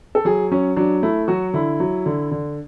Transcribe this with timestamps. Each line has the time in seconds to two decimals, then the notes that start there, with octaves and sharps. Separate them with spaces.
0.15 A4
0.25 F#3 G#4
0.51 F#3 C#4
0.76 F#3 D4
1.03 A3 E4
1.28 F#3 F#4
1.53 D3 E4
1.80 F#3
2.06 D3
2.31 D3